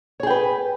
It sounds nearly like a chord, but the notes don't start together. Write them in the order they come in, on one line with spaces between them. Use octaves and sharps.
C#5 G#4 G5 B4